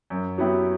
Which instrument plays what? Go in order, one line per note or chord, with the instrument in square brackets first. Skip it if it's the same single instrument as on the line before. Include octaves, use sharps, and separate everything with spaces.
[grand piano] F#2
F#3 B3 E4 G4